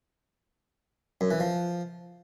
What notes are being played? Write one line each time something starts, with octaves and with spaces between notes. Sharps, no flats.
F#2
E3
F3